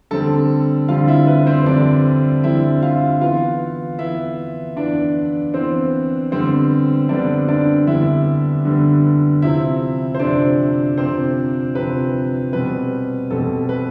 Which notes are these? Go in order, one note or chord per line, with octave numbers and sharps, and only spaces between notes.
D3 G3 C4 A4 A5
D3 G3 C4 F4 F5
E4 E5
B4
C4 C5
D3 G3 C4 D4 D5
D3 G3 C4 E4 E5
F4 F5
E3 B3 F4 F5
E3 B3 E4 E5
E3 B3 D4 D5
E3 B3 C4 C5
D3 G3 B3 C4 C5
D3 G3 B3 D4 D5
D4 D5
D3 G3 B3 E4 E5
D3 G3 B3
C3 F3 C4 E4 E5
C5
C3 F3 C4 D4 D5
C3 F3 C4 C5
C3 F3 C4 B4
B2 G3 C4 B4
B2 G3 C4 A4
B4